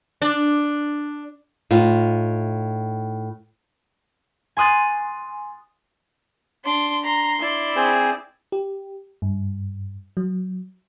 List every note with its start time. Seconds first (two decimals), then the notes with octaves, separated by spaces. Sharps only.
0.22 D4
1.71 A2 D#4 F4
4.57 G#5 C6 D#6 F#6 A6
6.65 D4 C6
7.04 A#5 C6
7.39 E4 D5
7.76 C4 G#4 C5
8.52 G4
9.22 G2
10.17 F#3